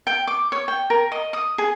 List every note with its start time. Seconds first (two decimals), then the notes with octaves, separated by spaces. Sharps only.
0.07 G5
0.27 D6
0.52 C#5
0.68 G5
0.90 A#4
1.12 D#5
1.33 D#6
1.58 G#4